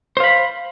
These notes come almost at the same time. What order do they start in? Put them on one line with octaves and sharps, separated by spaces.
C5 F5 B5